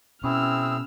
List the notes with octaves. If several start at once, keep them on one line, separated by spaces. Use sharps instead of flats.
B2 C4 C#4 E4 G#4 E6 F6